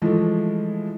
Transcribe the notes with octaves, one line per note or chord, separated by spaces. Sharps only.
E3 F3 G#3 A3